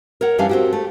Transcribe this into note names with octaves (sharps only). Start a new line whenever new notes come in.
A#4 C#5 F#5
F#2 E3 G3 C#4 D4 F5
C4 F#4 G4
A3